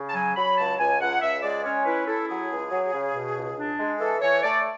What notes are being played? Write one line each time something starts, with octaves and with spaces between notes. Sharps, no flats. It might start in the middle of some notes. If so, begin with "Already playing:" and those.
Already playing: C#3
A5
F#3 G#5
F#3 B5
C#2 A5
C#2 G#5
C#2 F#5
C#2 E5
G#3 D5
C#4 C#5
E4 B4
E4 A4
F#3 G#4
C#2
F#3
C#3
B2
C#2
D4
G#3
E3 A4
E3 C#5
A3 D5